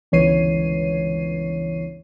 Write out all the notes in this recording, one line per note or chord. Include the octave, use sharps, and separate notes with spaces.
G1 C#2 E3 C#5 C7 D#7